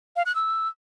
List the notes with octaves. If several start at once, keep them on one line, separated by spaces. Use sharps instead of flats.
F5
F#6
E6